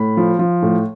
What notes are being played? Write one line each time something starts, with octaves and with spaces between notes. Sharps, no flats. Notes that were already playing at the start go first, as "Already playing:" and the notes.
Already playing: A2 B5
F3
F3
A2